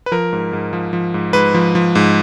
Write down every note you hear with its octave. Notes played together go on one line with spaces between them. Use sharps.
B4
F3 A#4
G#2
G#2
F3
F3
G#2
G#2 B4
F3
F3
G#2